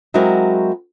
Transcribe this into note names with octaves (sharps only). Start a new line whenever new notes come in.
F#3 G#3 C4 E4 F#4 A#4